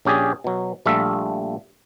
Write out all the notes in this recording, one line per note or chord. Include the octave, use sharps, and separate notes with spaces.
A#1 C#4 G4 G#4 D5
B2 F#3
A#1 G3 A3 F4 E5